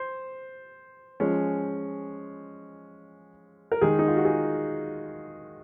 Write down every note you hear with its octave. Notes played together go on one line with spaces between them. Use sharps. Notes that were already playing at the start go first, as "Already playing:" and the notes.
Already playing: C5
F3 G#3 C#4
A#4
D#3 G#3 D#4 G#4
D#4
F4
F#4
G#4